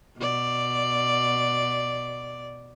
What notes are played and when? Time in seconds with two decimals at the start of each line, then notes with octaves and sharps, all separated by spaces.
0.18 B2 D5